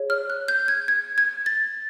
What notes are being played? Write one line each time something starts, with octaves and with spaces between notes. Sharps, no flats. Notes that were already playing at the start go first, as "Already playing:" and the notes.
Already playing: G#4 C#5
F6
F#6
G6
G#6
G#6
G#6
A6